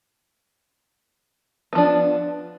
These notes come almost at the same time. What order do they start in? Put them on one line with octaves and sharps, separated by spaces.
B3 F3 D4